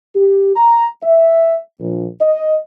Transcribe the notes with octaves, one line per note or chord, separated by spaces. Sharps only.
G4
A#5
E5
A#1
D#5